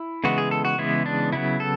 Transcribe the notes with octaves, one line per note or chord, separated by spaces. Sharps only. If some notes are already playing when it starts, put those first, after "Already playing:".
Already playing: E4
C#3 E3 G#3 B3 F#4
G#4
A4
F#4
C#3 E3 G#3 B3 E4
D4
C#3 F#3 B3 E4
A4